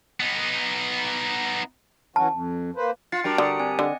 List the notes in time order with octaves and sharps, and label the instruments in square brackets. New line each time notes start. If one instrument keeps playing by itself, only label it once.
[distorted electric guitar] B3 D#4
[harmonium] E3 C#4 F#4 [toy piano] A5
[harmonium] F2
A#3 B4 C5
[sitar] F4 [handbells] A6 C7 C#7
[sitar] G3 D4 A#4 [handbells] F#4 G5
[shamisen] D3 [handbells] D#6 C#7
[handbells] C4 D5 G#5
[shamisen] D3 [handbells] D#5 F#5